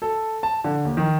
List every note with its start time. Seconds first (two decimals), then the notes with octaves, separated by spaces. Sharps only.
0.02 A4
0.43 A5
0.64 D3
0.85 D#2
0.97 D#3